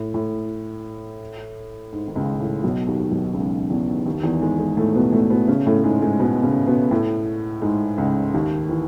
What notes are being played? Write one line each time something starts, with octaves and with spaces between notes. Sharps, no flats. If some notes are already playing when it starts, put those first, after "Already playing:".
Already playing: A2
A2
G#2
D#3
C#2 C#3
A2
B1 B2
D#2 D#3
B1 B2
C#2 C#3
E2 E3
D#2 D#3
E2 E3
G#2 G#3
G#2 G#3
A2 A3
B2 B3
A2 A3
B2 B3
C#3 C#4
A2 A3
A3
G#2 G#3
G#2 G#3
B2 B3
C#3 C#4
B2 B3
A2 A3
G#2 G#3
C#2 C#3
D#2 D#3
E3